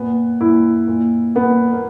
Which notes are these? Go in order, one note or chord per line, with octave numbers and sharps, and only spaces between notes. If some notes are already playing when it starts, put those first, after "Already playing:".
Already playing: A#2 B3
A#2 E4
A#2
A#2 B3
A#3